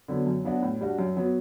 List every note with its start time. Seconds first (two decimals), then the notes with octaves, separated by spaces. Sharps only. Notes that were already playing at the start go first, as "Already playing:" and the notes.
0.08 D3 F#3 B3
0.27 F#2
0.45 F#3 B3 D4 F#4
0.62 A2
0.81 G3 D4 F#4
0.99 F#2
1.17 F#3 B3